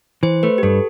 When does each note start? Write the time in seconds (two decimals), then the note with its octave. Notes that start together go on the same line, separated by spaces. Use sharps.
0.23 E3 C5
0.43 A3 B4
0.58 G4
0.63 G2 A4